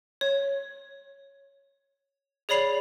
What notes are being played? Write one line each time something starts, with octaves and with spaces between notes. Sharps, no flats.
C#5
G#4 C#5 D5 B5 C7 F7